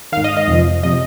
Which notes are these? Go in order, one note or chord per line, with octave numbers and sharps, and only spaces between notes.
G#2 D#3 F5
D#5
D#5
F2 C3 F3
C3 F3 D#5